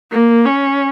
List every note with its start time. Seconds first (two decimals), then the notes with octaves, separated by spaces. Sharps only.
0.12 A#3
0.45 C#4